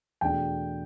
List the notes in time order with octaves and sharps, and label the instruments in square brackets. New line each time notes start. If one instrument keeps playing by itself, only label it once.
[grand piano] E2 B2 A3 D4 G5